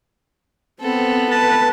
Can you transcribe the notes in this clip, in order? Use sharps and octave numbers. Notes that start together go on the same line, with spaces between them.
B3 C4 A4
B4 A5